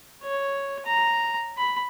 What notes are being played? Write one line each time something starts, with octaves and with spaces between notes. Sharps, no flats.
C#5
A#5
B5